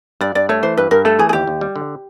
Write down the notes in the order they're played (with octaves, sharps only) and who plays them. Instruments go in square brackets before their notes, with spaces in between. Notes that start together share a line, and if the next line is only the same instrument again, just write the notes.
[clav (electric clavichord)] G2 [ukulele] D5
[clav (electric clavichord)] G2 [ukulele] D5
[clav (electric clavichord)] A3 [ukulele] C#5
[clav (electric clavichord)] E3 [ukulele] C5
[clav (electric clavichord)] G2 [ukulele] B4
[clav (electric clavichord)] G2 [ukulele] A#4
[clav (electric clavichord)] A3 [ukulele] A4
[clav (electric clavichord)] E3 [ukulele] G#4
[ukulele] G#4
[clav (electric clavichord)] D#2 [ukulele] G4
[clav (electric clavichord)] D#2
G3
D3